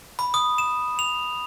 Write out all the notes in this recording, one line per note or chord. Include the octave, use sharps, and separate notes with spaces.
B5
D#6
E7
F7